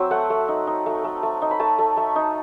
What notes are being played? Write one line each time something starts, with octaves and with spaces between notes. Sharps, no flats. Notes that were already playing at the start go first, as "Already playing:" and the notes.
Already playing: F#3 C4 C5 E5
A3 F#5
A3
D#4
D#4
A3
A3
A3
D#4
B5
A3 A5
A3
A3
D#4